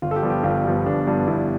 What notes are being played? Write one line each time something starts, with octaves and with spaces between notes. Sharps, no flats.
G1 F4
A4
G4
G2 F3 B3
G4
G1 F4
G2 F3 B3
G1 D4
G2 F3 B3
G1 E4